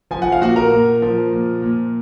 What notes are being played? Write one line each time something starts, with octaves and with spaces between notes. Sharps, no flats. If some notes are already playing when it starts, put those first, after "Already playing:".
F3 G#5
F#5
F5
A#2 F#4 F#5
A#4 A#5
A#2
F3
A#2
A#2